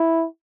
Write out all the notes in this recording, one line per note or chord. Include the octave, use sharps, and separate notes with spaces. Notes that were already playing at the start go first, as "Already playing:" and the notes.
Already playing: E4